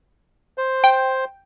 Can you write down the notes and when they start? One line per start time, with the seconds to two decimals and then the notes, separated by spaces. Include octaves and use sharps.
0.58 C5
0.84 G5